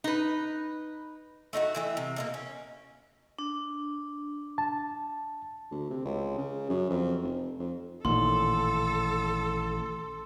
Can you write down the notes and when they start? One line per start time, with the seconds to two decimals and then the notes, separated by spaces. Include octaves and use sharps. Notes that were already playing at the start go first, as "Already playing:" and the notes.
0.04 D#4 B4
1.53 A3 D#4 F4 F#4
1.75 A2 E3 E5
1.97 C3
2.16 B2 A3 A#3
2.34 C#4
3.39 D4
4.58 A5
5.71 D2
5.91 C3
6.05 C#2
6.38 C#3
6.70 F#2
6.90 F2
7.23 F1
7.59 F2
8.05 A1 A#2 D#3 A4 C6